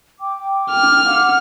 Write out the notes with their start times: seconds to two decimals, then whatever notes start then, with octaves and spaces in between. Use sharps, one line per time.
0.20 G5 D6
0.71 F6
1.05 F5 F#5 D6